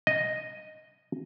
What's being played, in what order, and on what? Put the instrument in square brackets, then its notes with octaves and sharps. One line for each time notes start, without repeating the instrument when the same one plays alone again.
[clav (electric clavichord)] D#5